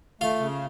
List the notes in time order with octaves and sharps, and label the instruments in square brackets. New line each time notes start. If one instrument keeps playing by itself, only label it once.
[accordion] A3 [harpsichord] F4 F5
[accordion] C#3